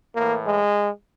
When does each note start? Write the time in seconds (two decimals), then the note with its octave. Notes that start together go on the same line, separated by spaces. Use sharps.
0.16 A2 E3 A#3
0.47 G#3